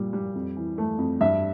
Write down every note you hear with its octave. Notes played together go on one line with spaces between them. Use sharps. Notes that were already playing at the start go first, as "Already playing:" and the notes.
Already playing: A#2 G3
G3
F2
E3
A3
F2
G2 E5